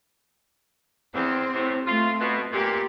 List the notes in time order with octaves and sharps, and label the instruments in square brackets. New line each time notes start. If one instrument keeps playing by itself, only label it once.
[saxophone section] E2 [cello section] C4
[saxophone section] A2 C3
[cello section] A3 [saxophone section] F4
[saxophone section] B2
[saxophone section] A#2 [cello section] G4